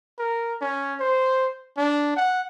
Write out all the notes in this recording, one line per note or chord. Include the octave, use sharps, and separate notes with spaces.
A#4
C#4
C5
D4
F#5